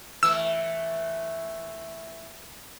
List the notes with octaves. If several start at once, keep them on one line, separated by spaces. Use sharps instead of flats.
E3 A3 E6